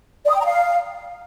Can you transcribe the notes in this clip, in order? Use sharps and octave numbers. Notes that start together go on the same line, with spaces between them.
D5
D#6
G5
A#5
F5